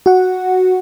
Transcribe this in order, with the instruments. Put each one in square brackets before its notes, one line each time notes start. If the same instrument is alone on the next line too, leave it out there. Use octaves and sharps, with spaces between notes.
[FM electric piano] F#4 F#5